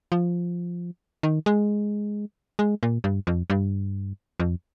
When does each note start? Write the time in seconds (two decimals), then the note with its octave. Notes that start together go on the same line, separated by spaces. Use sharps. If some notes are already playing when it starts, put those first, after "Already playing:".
0.12 F3
1.23 D#3
1.46 G#3
2.59 G#3
2.83 A#2
3.04 G2
3.27 F2
3.50 G2
4.40 F2